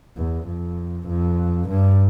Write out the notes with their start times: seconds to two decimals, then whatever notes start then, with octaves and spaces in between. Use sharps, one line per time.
0.17 E2
0.47 F2
1.08 F2
1.69 G2